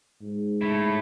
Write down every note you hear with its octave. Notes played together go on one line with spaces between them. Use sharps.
G#2
A3 E4